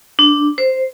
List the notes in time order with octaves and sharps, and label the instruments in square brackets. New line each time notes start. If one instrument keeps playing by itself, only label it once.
[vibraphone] D4
C5